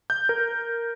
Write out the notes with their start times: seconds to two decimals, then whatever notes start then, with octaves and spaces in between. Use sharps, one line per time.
0.10 G6
0.29 A#4